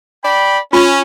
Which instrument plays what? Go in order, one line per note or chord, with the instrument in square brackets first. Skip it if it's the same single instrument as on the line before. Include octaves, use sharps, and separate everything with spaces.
[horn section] D5 G5 B5
[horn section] C#4 [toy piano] F4